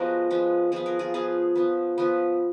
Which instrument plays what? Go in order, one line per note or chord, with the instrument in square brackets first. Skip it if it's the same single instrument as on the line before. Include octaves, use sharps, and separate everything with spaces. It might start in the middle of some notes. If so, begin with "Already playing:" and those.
Already playing: [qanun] F3 G#3 B3 F#4 A#4
F3 G#3 B3
F3 B3 G#4
A#4
F4 G#4
F3 B3 F4 G#4
F3 B3
F3 B3